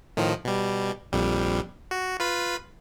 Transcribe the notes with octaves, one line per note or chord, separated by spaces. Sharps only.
A2 D#3 F3
B2 G3
A#1 F2 G3
F#4
F4 B4 B5